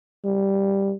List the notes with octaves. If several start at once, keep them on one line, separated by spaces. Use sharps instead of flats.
G3